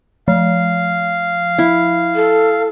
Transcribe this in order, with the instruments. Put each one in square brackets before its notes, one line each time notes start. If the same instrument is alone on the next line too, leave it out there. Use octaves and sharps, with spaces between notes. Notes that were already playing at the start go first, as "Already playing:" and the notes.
[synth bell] F3 [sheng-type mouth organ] F5
[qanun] E4
[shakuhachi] A4